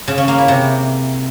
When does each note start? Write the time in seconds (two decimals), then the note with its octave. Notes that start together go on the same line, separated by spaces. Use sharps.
0.08 C#3
0.18 C#4
0.28 A#3
0.38 E4
0.48 C3